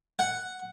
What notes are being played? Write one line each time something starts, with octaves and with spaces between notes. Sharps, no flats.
F#5